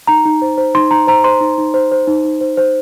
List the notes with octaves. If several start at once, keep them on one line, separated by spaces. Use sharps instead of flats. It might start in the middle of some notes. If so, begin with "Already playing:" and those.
D#4 A#5
D#4
C5
C5
D#4 C6
D#4 A#5
C5 A#5
C5 C6
D#4
D#4
C5
C5
D#4
D#4
C5
C5